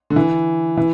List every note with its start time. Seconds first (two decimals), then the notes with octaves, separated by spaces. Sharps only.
0.10 D3
0.16 E3
0.77 E3